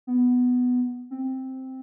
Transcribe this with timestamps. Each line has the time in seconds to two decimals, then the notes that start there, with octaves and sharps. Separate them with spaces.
0.07 B3
1.11 C4